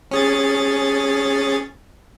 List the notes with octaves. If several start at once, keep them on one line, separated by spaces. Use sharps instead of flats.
C#4 G#4 A6